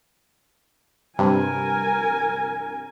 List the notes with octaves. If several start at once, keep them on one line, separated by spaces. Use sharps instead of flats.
G2 C3 A#4 G#5